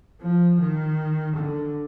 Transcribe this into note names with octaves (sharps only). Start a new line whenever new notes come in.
F3
D#3
D3